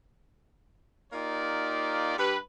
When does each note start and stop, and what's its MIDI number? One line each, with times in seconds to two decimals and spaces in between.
1.13 2.15 58
1.13 2.15 63
1.13 2.15 65
1.13 2.15 67
1.13 2.15 74
2.17 2.36 43
2.17 2.36 67
2.17 2.36 71